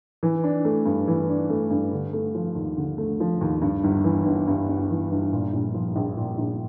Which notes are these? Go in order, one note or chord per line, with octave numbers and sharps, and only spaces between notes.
E3
D4
A3
G2
E3
D4
A3
G2
D3
A3
F3
D#2
D3
A3
F3
D#2
G2
G1
E3
G1
G2
G1
E3
G1
A#2
A#1
F3
A#1
A#2
A#1